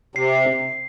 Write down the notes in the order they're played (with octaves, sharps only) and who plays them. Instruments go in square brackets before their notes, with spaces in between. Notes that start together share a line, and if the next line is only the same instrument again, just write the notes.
[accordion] C3 [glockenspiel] C7
[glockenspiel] C7